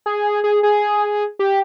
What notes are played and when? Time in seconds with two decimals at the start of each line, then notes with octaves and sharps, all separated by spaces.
0.06 G#4
0.44 G#4
0.63 G#4
1.39 G4